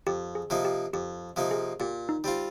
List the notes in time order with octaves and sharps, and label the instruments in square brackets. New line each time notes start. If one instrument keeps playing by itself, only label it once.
[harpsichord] F2 [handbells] G4
[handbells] G#4
[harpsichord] C3 F3 A#3 D#4
[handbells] G4
[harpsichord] F2 [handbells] G4
[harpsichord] C3 F3 A#3 D#4
[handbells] G#4
[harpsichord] A#2 [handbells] G4
[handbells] D#4
[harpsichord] G3 C4 F4